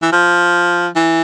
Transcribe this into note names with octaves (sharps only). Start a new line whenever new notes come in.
E3
F3
E3